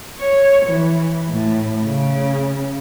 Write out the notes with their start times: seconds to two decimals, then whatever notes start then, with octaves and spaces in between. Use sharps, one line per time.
0.20 C#5
0.66 E3
1.30 A2
1.84 C#3